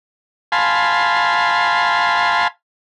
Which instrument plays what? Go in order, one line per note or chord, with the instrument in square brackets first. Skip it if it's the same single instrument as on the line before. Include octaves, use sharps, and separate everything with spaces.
[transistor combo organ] F5 G#5 A5 B5 C6